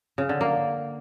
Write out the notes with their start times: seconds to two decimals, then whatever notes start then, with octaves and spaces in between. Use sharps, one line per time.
0.18 C#3
0.29 D3
0.41 A#3